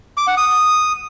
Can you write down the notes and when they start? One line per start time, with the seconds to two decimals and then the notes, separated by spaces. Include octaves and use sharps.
0.17 D6
0.27 F#5
0.37 D#6